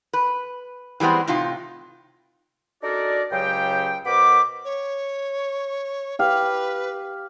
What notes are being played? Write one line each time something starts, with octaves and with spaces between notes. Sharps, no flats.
B4
E3 G3 G#3 B3 C4
A2 C3 D#4 F4
D4 D#4 F#4 A4 A#4 D5
C#2 C#3 F#3 G4 C5 G5
B2 B3 A#4 C5 B5 D6
C#5
G4 B4 F5